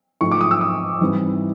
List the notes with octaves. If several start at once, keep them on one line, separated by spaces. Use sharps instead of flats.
G#2 F3 A3 C#6
D6
D#6
E6
D#6
G#2 E3 G3 C4 E4